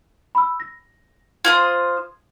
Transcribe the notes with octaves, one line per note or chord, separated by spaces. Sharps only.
B5 E6
A#6
F4 C5 D#6 G#6